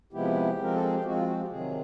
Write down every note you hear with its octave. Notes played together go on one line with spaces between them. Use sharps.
C3 F3 G#3 B3 E4 G4
F3 G#3 C4 A#4
A4
G#4
G4
F3 G#3 C4 F#4
F4
F#4
G4
C3 D#3 F#3 G#4